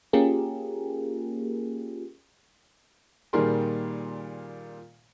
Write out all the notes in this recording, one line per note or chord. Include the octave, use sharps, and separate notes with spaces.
A#3 C#4 F4 G4 G#4 A#4
A#2 D#3 G3 G#4 A#4 C6